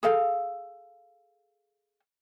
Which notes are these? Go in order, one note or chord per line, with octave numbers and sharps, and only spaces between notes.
G#4 A4 F5